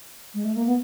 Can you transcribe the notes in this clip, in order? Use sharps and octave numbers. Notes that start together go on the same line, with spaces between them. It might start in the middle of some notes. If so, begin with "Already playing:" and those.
G#3
A3
A#3
B3